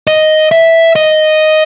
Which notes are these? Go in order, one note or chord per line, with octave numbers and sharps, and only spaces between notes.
D#5
E5
D#5